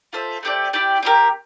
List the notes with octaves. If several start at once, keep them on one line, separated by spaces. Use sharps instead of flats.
F4 A4 C5 E5
A3 C4 G4 D5
E4 G4 D5 G5
C4 E4 G4 A#4